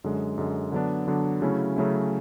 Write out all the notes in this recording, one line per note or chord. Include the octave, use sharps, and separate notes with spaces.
F#2 D3 G#3
F#2 D3 G#3
D3 F#3 B3 D4
D3 F#3 B3 D4
C#3 F#3 A3 C#4 E4
C#3 F#3 A3 C#4 E4